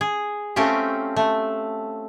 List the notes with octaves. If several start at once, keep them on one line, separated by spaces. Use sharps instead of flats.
G#4
A3 C4 C#4 F4 G4
A3